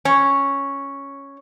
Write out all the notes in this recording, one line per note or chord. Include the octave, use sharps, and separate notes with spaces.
C#4